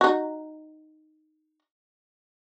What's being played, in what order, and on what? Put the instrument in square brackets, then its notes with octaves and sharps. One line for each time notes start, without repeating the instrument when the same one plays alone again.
[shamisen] D#4 F#4